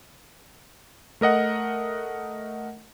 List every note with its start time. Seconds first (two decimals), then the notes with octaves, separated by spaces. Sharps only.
1.21 A3 A#4 D#5 F#5